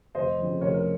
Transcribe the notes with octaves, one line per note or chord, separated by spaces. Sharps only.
F1 C5 D#5
F2 C#3
F1 A#4 C#5
A#4